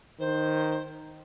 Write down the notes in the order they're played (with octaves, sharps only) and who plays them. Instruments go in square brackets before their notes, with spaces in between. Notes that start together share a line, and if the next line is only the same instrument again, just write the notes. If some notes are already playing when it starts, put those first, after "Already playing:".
[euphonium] D#3 [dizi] C5